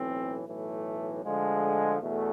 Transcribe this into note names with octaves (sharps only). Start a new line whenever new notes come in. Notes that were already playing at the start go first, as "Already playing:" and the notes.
Already playing: B1 A2 E3 C4
B1 A2 E3 A3
D2 D3 F3 G#3
E2 B2 A3